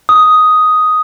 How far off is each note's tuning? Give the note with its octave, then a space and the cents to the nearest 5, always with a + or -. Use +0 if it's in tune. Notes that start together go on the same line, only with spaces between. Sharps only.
D#6 +5